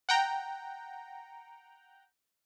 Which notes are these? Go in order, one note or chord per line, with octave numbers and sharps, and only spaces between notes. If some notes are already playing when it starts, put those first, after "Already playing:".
F#5 G5 A#5